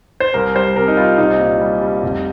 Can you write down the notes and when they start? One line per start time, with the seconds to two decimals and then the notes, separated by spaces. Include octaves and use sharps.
0.20 C5
0.34 C2 A#4
0.55 G3 C5
0.76 C3 A#4
0.88 D#4
0.97 G3 F4
1.18 C2 D#4
1.39 A#2
1.60 G3
1.81 G3
2.03 F1